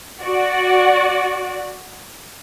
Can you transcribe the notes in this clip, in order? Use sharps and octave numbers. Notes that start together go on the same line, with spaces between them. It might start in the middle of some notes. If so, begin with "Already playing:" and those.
F#4 D5